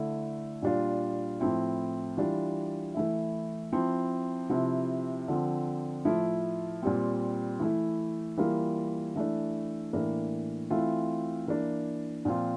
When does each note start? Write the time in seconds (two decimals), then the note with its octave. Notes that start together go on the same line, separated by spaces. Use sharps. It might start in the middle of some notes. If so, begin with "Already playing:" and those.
Already playing: D3 A3 E4
0.62 A#2 G3 D4 F4
1.40 A2 F3 C4 E4
2.17 E3 G3 D4 F4
2.94 E3 A3 E4
3.73 F3 C4 E4
4.50 C3 F3 C4 E4
5.28 D3 F3 C4
6.05 A2 F3 A3 E4
6.83 A#2 G3 C4
7.60 E3 A3 E4
8.37 E3 G3 A#3 F4
9.16 E3 A3 D4
9.93 A2 E3 A#3 D4
10.70 E3 A3 C4 F4
11.47 E3 A#3 D4
12.25 A#2 F3 C4 F4